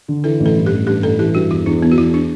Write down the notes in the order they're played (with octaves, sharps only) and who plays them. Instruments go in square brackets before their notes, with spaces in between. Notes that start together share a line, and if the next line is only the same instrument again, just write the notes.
[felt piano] D3
[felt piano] E3 [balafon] A4
[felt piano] A1
[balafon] A4
[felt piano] G2
[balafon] G4
[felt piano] A1
[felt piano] G2 [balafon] G4
[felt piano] A1 [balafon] A4
[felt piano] E3 [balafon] G4
[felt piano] G2 [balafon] F#4
[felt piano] E2 [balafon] E4
[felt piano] E2 [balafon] D4
[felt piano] E3 [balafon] B3
[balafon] F#4
[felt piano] E2 [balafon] E4
[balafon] D4